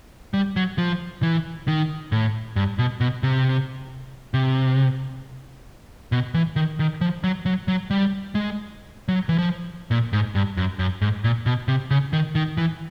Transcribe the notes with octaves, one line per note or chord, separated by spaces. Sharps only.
G3
F#3
F3
E3
D#3
A2
G2
B2
B2
C3
C3
B2
E3
D#3
D#3
F3
F#3
F#3
F#3
G3
G#3
F#3
E3
F3
A#2
G#2
G2
F#2
F#2
G#2
A#2
B2
C3
C#3
D#3
D#3
E3